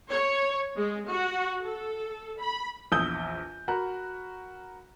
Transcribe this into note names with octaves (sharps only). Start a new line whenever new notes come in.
C#5
G#3
F#4
A4
B5
A#1 E2 D#6 E6 G6 G7
F#4 A#4 A#5 B5 F#6